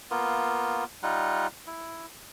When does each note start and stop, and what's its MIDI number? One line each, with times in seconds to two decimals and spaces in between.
0.11 0.84 58
0.11 0.84 59
0.11 0.84 65
1.03 1.47 55
1.03 1.47 63
1.03 1.47 65
1.03 1.47 78
1.67 2.06 64